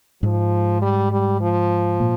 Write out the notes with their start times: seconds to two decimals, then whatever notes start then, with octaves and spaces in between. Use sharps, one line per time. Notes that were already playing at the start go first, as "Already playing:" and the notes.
0.23 G#2 F3 G#3
0.82 G3
1.11 G3
1.41 F3
2.00 A#2 A#3